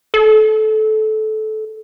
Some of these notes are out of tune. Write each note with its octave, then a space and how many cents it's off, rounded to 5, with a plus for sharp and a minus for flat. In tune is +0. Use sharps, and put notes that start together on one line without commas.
A4 -20